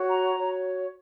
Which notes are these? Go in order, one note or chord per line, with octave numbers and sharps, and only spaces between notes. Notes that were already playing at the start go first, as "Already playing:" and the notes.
Already playing: F#4 C#5
A#5
F#4 C#5